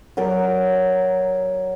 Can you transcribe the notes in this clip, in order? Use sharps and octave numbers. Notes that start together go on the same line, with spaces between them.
F#3 A#4 D5